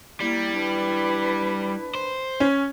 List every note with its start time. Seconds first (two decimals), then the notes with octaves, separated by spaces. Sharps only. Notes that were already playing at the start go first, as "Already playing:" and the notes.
0.20 G3 A#3 E4
0.59 D4 B4
1.95 C5
2.40 C#4